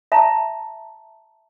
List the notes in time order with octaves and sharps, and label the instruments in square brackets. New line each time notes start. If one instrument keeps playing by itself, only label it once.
[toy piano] E5 A5 A#5